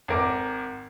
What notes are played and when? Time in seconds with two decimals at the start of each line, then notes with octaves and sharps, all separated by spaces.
0.08 G#1 A#4 D6